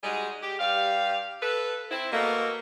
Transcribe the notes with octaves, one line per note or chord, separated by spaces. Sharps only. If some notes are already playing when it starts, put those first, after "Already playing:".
G3 G#3 D#4 F#4 G#4
G4
G2 G4 F5
A4 B4
C4 E4
B2 A3 A#3